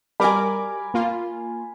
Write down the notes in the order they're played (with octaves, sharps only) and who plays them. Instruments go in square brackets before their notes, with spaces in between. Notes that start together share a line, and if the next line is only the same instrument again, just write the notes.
[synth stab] G3 A#4 D6 [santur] G#5 B5
[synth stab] A#3 F4